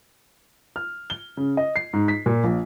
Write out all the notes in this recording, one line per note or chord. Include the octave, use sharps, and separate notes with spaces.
F6
G7
C#3
D#5
C7
G#2
B6
A#2
A#1